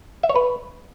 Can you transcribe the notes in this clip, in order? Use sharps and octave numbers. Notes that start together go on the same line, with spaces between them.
E5
C#5
B4